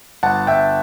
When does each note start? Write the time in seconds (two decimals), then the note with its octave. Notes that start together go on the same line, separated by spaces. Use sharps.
0.23 G1 F#5 A5
0.47 G1 E5 G5